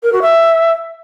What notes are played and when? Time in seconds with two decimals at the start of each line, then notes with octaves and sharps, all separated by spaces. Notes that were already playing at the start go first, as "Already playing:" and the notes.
0.03 A#4
0.12 F#4
0.21 E5